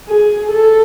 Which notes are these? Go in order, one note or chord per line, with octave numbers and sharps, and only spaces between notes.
G#4
A4